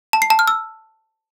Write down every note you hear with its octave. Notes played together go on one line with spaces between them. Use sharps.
A5
C7
A5
F6
E6